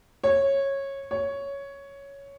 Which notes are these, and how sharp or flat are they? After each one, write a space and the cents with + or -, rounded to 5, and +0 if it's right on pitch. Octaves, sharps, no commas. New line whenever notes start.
C#5 -15
C#5 +5